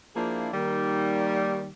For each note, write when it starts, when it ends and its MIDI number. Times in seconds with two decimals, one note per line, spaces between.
0.15 0.48 53
0.15 0.48 58
0.15 0.48 62
0.15 0.48 64
0.15 0.48 65
0.15 0.48 68
0.53 1.68 51
0.53 1.68 55
0.53 1.68 58